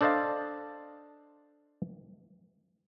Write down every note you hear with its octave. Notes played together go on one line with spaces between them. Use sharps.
D4 A4 C5 D#5 F5 A5